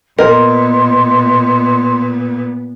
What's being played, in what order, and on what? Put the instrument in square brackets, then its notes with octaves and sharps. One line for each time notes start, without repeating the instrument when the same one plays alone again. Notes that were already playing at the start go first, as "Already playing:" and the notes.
[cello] A#2 B3 [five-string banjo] A#4 [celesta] D#5 [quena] C6